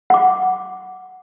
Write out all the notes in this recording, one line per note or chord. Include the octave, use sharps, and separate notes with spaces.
F#5 D6